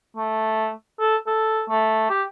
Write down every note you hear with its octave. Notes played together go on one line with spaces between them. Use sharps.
A3
A4
A4
A3
G4